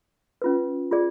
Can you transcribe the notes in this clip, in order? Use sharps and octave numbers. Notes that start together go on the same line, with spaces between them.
C#4 F4 B4
F4 G#4 D5